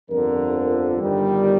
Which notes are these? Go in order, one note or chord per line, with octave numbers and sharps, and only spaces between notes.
G1 F2 D3 F3 A#4
G1 G2 D#3 G3